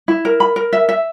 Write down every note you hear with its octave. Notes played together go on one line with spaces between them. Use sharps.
E4
A#4
B5
A#4
E5
E5